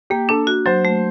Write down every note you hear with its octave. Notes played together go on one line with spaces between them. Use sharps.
A#3 G4
D4 A4
F#4
F#3 C5
A3